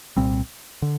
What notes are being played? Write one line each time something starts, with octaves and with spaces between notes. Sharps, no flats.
C2 A#2 G3 C4
D3